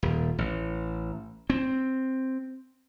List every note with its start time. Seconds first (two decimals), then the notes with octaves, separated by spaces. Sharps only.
0.03 D#1
0.38 A1
1.50 C4